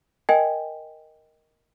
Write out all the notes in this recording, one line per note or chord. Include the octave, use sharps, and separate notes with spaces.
A#4 D#5 G5 G#5